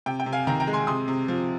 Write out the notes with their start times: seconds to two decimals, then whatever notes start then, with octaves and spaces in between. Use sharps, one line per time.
0.06 C3 G5
0.20 G5
0.26 C3
0.33 F5 G#5
0.47 D#3 G5 A#5
0.60 G5 A#5
0.67 G#3
0.73 G#5 C6
0.87 C3 C6 D#6
1.08 C3
1.28 F3